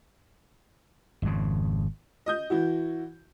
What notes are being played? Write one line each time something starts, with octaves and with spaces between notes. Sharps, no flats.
G#1 F2 C#3
D#5 D#6 G6
E3 E4 F#4